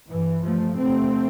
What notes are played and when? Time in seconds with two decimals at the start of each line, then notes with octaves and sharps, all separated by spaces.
0.10 G2 E3
0.44 G2 F3 A3
0.78 E2 C3 A3 C4